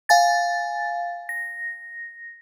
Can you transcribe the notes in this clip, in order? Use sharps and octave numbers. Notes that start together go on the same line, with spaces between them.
F5 G#5 A6
A#6